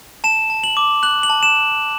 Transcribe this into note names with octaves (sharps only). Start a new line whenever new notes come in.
A5 E7
A5
F#7
D6
F#6 F#7
F#7
A5
E7